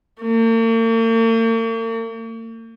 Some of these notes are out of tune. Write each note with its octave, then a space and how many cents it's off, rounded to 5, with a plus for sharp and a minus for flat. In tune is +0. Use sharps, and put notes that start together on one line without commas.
A#3 -45